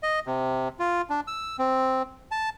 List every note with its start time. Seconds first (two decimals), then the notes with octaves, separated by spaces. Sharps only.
0.03 D#5
0.27 C3
0.79 F4
1.10 D4
1.27 E6
1.59 C4
2.31 A5